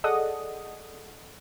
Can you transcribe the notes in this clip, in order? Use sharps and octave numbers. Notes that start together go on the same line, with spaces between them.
G#4 A4 D5 D#5 F#5 D#6